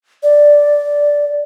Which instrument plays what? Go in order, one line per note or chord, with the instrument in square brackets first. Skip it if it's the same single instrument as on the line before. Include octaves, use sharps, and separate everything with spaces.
[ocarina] D5